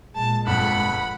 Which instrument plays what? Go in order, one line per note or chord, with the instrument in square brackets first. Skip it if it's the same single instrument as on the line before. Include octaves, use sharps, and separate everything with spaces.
[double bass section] A#2 G#3 [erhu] A5
[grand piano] G1 F2 [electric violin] F#5 [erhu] B5